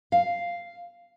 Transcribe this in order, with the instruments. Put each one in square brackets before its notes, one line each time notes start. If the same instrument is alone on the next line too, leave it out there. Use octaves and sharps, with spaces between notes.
[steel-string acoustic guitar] F5